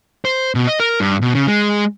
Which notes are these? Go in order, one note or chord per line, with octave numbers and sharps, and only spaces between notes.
C5
B2
D#5
A#4
G2
B2
C#3
G#3